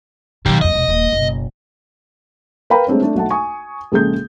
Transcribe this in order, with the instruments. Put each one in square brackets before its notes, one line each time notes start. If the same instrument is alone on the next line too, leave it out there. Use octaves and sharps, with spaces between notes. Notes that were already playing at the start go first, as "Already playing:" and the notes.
[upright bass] B2 F#3 [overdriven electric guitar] D#3 G4
[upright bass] F#1 F2 [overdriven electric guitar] D#5
[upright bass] E1 F2
D#1 A#3
F#1 B2
[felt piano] A#4 B4 F5 G5 A#5 B5
G#3 A3 C4 D4 C#5
A3 D4
B1 A3 F#5 A5
G#5 C#6 D#6
A#1 C#3 G#3 G#4 A4 G6